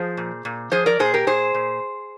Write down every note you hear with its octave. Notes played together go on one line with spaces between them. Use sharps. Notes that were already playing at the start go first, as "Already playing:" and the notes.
Already playing: F3 G#4 C5
A#2
A#2
F3 G#4 C5
A#4 D5
A#2 G#4 C5
G4 A#4
A#2 G#4 C5
A#2